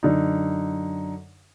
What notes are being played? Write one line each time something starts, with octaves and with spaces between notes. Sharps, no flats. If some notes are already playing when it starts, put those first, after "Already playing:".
F#2 D3 D#4